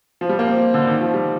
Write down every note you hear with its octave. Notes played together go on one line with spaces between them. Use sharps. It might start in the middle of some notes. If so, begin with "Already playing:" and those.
F3
G3
A#3
C4
D3
D#3
F3
G3